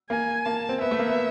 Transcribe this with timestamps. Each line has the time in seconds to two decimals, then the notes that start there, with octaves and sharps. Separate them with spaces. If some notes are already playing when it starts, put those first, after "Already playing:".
0.10 A#3 G#5
0.45 A#3 A5
0.69 C4
0.81 B3 E5
0.91 A3
0.99 A#3
1.08 B3